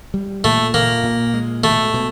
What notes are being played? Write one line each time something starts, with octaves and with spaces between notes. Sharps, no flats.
G3
A#2 A3
A#2 A#3
A#2
G#3
B2 A3
B2